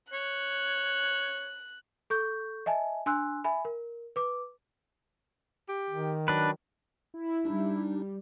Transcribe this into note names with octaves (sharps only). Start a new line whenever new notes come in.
C#5 F#6
A4 C#6 G6
D#5 E5 G#5 A5
D4 G#5 C6 E6 F#6
E5 G#5 B5
A#4
B4 D6
G4
D#3
F#3 D4 B4
E4
G3 D4 D#4